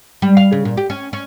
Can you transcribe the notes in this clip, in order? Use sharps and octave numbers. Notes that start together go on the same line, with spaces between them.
G3
F5
C#3
A#2
G4
C#4
C#4